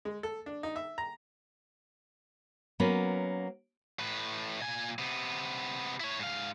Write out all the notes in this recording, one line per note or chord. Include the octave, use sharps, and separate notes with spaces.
G#3
A4
D4
D#4
E5
A#5
F#3 A#3 B3 C#4 B4
A2 B4
A#2 G#5
C3 B3
E4 C#5
G#2 F5